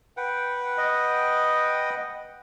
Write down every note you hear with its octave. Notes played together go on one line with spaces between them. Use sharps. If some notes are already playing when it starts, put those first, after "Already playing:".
B4 F#5 G5
D#5